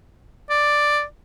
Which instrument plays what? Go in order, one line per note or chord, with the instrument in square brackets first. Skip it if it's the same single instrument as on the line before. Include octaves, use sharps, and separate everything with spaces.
[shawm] D5